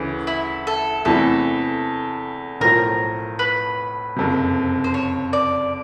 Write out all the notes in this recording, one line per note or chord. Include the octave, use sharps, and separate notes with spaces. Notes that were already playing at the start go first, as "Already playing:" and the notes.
Already playing: D2 C#3 E3 G#4
E4
A4
E2 C3 E3 A3 A4
B1 A2 F3 A#4
B4
F#1 F2 C3
C5
C#5
D5